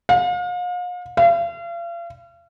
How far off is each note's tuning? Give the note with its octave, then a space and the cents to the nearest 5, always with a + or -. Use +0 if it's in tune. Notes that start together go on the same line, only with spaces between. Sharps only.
F5 +40
F5 -40